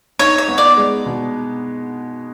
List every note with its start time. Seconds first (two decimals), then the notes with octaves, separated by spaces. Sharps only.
0.19 D#4 C#5
0.38 C#5
0.48 B3
0.58 D5
0.77 G#3
1.06 B2